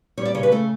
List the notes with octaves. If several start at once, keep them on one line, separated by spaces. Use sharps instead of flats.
G3 C#5
D5
C#3 C#5
B4
A3 A4